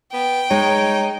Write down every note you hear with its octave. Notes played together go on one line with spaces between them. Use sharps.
B3 G5
G#3 D#4 C#5